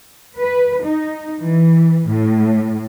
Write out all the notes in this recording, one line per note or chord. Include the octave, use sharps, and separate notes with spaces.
B4
D#4
E3
A2